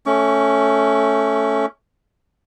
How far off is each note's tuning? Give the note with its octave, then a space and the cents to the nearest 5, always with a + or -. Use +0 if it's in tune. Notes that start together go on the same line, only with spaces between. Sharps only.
A3 +0 C#4 +0 C#6 +35